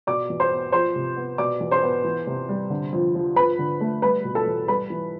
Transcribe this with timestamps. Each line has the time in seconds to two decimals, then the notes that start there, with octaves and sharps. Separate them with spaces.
0.07 B2 D5 D6
0.29 E2
0.40 C5 C6
0.52 B3
0.72 F3 C5 C6
0.95 C3
1.17 B3
1.38 B2 D5 D6
1.60 E2
1.71 C5 C6
1.83 B3
2.04 E3
2.27 C3
2.49 G3
2.70 D3
2.93 F2
3.15 F3
3.36 F3 B4 B5
3.59 D3
3.80 A3
4.02 G3 B4 B5
4.25 B2
4.35 A4 A5
4.46 E2
4.68 G3 B4 B5
4.90 E3